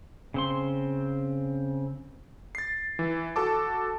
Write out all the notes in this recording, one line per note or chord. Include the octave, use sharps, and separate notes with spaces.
C#3 C4 C6
A6 C7
E3
F#4 A4 A5 D6